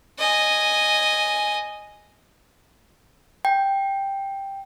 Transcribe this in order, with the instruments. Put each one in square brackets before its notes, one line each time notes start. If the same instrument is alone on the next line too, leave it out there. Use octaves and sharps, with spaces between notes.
[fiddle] D#5 G#5
[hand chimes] G5